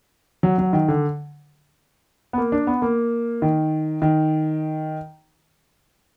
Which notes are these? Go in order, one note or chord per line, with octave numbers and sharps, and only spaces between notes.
F#3
F#3
D#3
D3
B3
A#3
D4
B3
A#3
D#3
D#3